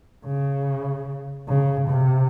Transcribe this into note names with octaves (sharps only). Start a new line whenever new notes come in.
C#3
C#3
C3